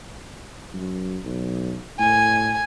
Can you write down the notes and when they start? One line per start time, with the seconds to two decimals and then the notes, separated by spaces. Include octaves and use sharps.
0.74 F#2
1.24 B1
1.99 A2 G#5